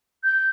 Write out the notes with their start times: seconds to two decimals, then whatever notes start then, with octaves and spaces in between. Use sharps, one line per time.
0.24 G6